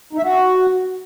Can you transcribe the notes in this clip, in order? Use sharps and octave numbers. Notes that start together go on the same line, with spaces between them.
D#4
E5
F#4